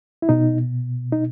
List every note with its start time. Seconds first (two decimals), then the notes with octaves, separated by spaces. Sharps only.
0.22 E4
0.29 B2 D#4
1.12 D#4